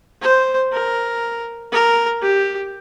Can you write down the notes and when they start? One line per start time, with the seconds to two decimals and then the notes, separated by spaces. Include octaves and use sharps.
0.22 C5
0.72 A#4
1.72 A#4
2.22 G4